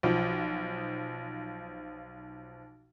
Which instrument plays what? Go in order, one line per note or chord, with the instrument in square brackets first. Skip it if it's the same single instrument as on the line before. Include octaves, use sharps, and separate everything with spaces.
[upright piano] B1 F3